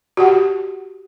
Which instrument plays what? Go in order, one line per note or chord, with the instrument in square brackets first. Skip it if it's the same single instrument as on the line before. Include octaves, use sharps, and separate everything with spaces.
[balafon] F#4 G4 F#5